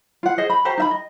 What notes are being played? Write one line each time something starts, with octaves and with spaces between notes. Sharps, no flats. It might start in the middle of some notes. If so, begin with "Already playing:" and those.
F4 F#5
G#4 C5 D#5
B5
F#4 G4 C5 A#5
D#4 E5 B5
D#5